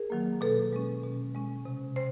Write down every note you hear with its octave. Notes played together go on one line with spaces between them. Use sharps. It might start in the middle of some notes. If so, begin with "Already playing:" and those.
Already playing: G#4 A#4
D#3 F#3 A#3
B2 A4 B4
G#3 C#4
B2
G#3 C#4
C3
C5